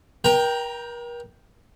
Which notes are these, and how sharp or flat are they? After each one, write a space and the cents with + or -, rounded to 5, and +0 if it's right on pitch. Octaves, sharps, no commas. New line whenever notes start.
A#4 +40 G5 +0 A#5 +0